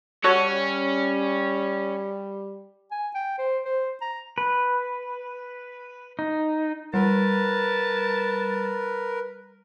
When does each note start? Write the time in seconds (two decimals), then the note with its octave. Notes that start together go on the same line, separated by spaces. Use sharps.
0.24 G3 C#4 F#4 A4 C#5
2.91 G#5
3.15 G5
3.38 C5
3.65 C5
4.01 A#5
4.38 B4
6.19 D#4
6.94 G3 A#4 B4 A5